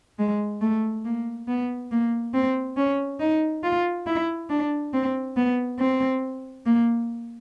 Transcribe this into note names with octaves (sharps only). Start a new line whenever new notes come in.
G#3
A3
A#3
B3
A#3
C4
C#4
D#4
F4
E4
D4
C4
B3
C4
A#3